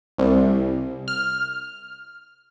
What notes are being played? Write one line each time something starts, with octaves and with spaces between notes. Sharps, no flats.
C2
F6